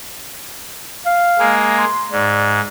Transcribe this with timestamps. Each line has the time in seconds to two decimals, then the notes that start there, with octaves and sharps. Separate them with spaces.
1.06 F5
1.38 G#3 A#3
1.78 C6
2.11 G#2 D5